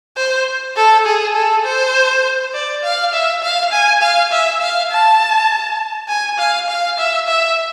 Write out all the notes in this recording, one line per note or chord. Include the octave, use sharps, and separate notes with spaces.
C5
A4
G#4
A4
C5
D5
F5
E5
F5
G#5
F5
E5
F5
A5
G#5
F5
F5
E5
E5